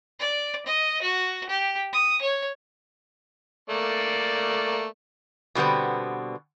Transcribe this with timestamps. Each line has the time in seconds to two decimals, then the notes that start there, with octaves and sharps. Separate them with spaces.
0.20 D5
0.66 D#5
1.02 F#4
1.49 G4
1.93 D#6
2.22 C#5
3.70 A3 A#3 D5
5.55 B2 D3 G3 B3 C4